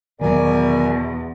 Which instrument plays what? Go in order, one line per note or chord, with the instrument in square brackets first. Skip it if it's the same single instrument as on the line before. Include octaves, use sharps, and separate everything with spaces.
[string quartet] E2 [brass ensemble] B2 [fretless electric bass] D#3 F#3 [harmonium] A#4 D5 G#5